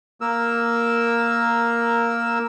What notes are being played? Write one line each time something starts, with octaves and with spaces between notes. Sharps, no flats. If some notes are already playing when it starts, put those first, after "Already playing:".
A#3 A#4 E6